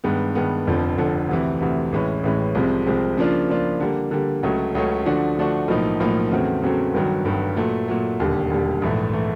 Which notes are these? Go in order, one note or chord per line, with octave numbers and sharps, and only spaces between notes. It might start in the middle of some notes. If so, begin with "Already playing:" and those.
G2 D#3 G#3 B3
G2 D#3 G#3 B3
F1 F2 D3 F3
F1 F2 D3 F3
D2 C3 E3
D2 C3 E3
A1 A2 E3 G#3 C#4
A1 A2 E3 G#3 C#4
C2 C3 F3 G#3 C4
C2 C3 F3 G#3 C4
C#3 F3 A#3 D4 F4
C#3 F3 A#3 D4 F4
D3 G3 A#3
D3 G3 A#3
C#2 C#3 F#3 A3 C#4
C#2 C#3 F#3 A3 C#4
D3 F3 A3 D4 F#4
D3 F3 A3 D4 F#4
B1 A2 F3 A#3 D#4
B1 A2 F3 A#3 D#4
E2 C#3 F#3 A3 C4
E2 C#3 F#3 A3 C4
G1 G2 D#3 F#3
G1 G2 D#3 F#3
A#2 F#3 A3
A#2 F#3 A3
E1 D#2 D3 G3
E1 D#2 D3 G3
A#1 G#2 E3 A3
E3 A3